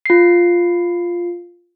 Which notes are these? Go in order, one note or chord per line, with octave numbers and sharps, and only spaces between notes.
F4 C7